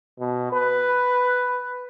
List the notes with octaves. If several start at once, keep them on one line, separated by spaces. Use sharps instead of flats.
B2
B4